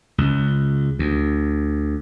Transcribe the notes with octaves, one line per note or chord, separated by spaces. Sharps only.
C#2
D2